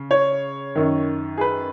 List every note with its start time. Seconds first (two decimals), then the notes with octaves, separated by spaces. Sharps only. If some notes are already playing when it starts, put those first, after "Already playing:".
Already playing: C#3
0.11 C#5
0.75 F#2 D#3
1.37 G#4
1.41 B4